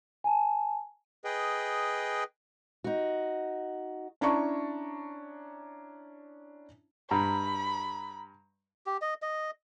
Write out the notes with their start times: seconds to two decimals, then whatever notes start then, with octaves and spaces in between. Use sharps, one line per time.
0.24 G#5 A5
1.24 G#4 B4 D#5 G5
2.84 D#4 F#4
4.21 C#4 D4 E4 A5 A#5 C#6
7.11 G2 A#5 B5
8.86 G4
9.02 D#5
9.22 D#5